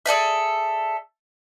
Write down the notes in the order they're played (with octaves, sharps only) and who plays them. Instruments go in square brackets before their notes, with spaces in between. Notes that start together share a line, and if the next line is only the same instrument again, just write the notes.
[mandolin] G#4 A4 D5 E5